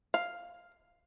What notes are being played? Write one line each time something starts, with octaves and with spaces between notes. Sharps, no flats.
F5